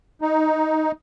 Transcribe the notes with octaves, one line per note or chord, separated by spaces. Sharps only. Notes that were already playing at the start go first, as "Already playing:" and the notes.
D#4